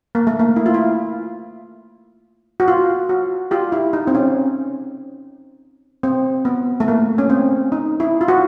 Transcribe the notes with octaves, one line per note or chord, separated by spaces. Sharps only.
A#3
A3
A#3
E4
F4
E4
F#4
F4
F#4
F4 G4
E4
D#4
C4
C#4
C4
B3
A3
A#3
C#4
C4
D#4
E4
F4
F#4